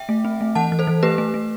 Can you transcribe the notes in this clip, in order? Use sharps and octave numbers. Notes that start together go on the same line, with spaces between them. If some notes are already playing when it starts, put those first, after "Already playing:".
Already playing: E5 G5
A3
C4
A3
E3 F#5 A5
E3
A4 C5
E3
A3 G4 B4
A3
A3